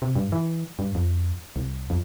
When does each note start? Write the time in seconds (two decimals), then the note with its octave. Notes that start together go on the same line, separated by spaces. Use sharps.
0.02 C3
0.16 G2
0.32 E3
0.79 G2
0.95 F2
1.56 C2
1.90 F2